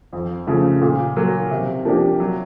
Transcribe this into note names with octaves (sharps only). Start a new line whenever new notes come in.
F2
C#3 F3 A3
A#2
F#3 A#3
C3
F3 A#3 D4 G4
F#3